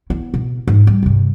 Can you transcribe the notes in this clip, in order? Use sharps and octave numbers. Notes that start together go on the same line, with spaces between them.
B3 E4
B2
G#2
G3
G2 C3